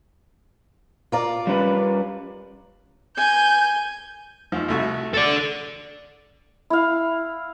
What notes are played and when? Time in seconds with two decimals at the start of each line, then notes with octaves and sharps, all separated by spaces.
1.12 F4 A#4 D5
1.47 G3 C#4 B4
3.17 G#5 G6
4.52 D#2 F3
4.68 C2 A3 F#4
5.14 A4 D5
6.70 E4 F5